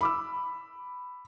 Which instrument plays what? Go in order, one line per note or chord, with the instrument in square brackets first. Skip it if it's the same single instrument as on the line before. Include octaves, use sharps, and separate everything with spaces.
[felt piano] B5 D6 E6